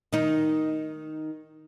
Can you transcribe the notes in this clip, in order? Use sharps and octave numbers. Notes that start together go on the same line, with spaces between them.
D#3 D#4